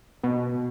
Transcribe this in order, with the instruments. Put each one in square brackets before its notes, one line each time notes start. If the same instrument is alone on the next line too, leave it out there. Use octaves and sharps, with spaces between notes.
[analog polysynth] B2